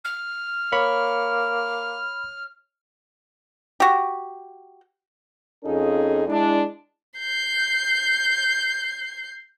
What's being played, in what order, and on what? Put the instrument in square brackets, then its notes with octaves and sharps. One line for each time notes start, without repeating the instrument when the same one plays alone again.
[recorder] F6
[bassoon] A#3 [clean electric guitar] C#5 [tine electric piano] B5
[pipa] F#4 G4
[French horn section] F2 C#4 D#4 F4 G#4 A4
G#3 D4 E4
[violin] G6 C7